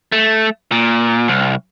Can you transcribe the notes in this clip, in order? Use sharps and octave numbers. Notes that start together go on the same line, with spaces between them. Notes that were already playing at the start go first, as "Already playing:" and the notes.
A3
A#2
C2